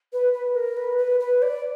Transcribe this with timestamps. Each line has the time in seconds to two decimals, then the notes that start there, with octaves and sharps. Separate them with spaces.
0.12 B4
0.33 B4
0.54 A#4
0.76 B4
0.98 B4
1.20 B4
1.42 D5